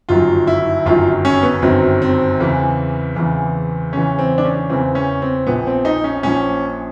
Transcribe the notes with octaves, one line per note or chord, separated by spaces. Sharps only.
G1 F#2 D#3 F#3 F4
E4
G1 F#2 D#3 F#3 F4
C#4
B3
G1 F#2 D#3 F#3 C4
C4
E2 C#3 E3
E2 C#3 E3
E2 C#3 E3 C#4
C4
D4
C#4
E2 C#3 E3 C4
C#4
C4
A#1 A#2 F3 B3
C4
D#4
C#4
A#1 A#2 F3 C#4